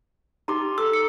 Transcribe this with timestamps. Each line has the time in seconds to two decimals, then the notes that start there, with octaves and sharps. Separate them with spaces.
0.48 D#4 G4 A#5 C6 D6
0.78 A4 E6
0.93 C#7